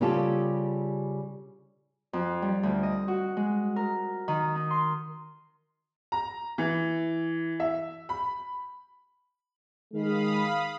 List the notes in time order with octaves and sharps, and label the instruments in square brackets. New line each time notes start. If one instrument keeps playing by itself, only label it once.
[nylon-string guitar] C#3 G3 C#4 F4 G4 A4
[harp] F2
G3
D2
D#5
F#4
G#3
A#4
D#3
D#4
C6
[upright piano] A#5
E3
E5
B5
[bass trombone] D#3 [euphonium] G#3 [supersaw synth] F5 B5 D#6